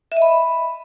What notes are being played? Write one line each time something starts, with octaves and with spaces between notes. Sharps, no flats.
E5
D#5
B5